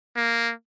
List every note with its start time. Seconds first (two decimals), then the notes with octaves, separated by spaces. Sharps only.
0.16 A#3